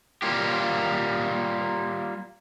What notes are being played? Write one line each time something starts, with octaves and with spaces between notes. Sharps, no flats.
G3 A#3 F4 G4